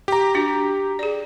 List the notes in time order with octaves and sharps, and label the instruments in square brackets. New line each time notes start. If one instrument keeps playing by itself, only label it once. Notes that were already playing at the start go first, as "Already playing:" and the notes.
[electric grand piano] G4 A#5
[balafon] D4 F#4
G#4 D5